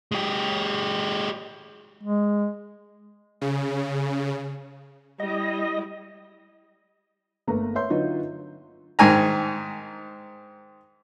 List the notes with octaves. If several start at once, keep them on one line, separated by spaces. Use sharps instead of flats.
G#3 G4
G#3
C#3
G3 E4 D#5
G1 A3 A#3 B4 A#5
B4 C#5 E5 C6 G6
D3 F#3 D#4 F4 B4
G#2 D#3 G#5 A#5